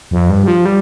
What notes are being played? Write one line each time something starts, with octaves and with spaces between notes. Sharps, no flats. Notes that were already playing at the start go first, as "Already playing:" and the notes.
F2
G2
G3
F3
G3